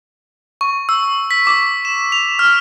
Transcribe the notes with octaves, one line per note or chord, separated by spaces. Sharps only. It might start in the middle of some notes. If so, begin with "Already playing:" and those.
C#6
E6
B6
D6
E7
F7
F6